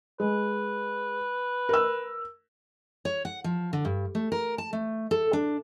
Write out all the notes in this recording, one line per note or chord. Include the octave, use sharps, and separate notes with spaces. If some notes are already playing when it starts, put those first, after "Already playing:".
G#3 B4
A#4 E6
C#5
F#5
F3
D3
G2
A3
A#4
A5
A3
A4
D4